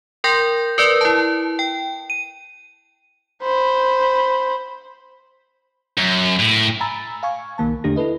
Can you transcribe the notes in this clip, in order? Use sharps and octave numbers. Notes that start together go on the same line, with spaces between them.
A#4 G5 C6 G6 A#6
A#4 B4 D5
E4 A5
G5
D#7
C5 B5
F#2
A2
G#5 A#5 B5 E6 A6
F5 G#5 C#6 G#6
B1 D#3 A#3 A5
E2 D3 A3 D4 G4 A#6
E4 A4 B4 D#5